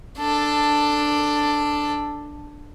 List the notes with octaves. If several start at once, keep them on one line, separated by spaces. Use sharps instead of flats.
D4 A4